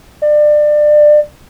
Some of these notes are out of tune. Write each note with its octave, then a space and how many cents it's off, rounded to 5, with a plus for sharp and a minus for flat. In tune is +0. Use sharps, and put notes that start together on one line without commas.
D5 +25